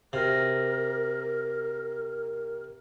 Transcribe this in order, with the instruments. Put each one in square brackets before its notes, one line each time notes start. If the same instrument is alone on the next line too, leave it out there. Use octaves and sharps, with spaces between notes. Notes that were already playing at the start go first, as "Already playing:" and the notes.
[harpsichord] C3 [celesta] F#4 F6 A#6 [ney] A#4